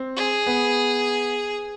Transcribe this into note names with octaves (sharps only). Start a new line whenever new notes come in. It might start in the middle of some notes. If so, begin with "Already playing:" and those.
Already playing: C4
G#4
B3